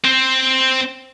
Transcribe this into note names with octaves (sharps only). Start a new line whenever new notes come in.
C4 C5